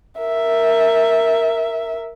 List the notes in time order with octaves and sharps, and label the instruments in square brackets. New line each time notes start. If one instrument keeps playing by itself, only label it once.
[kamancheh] A#4 E5